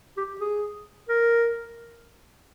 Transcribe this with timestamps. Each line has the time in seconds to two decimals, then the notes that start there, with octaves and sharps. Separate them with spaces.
0.17 G4
0.40 G#4
1.09 A#4